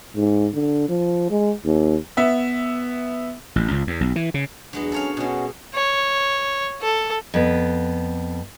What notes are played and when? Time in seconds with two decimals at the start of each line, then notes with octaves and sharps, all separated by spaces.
0.16 G#2
0.54 D3
0.89 F3
1.30 G#3
1.65 D#2
2.17 B3 E5
3.56 A1
3.71 C#2
3.87 E2
4.01 B1
4.16 E3
4.34 C#3
4.73 E2 F#3 G#3 B3 D4
4.92 C#4 A4 C#5 F5
5.17 B2 G#3 B3 C#4 F#4
5.74 C#5
6.82 A4
7.34 F2 B3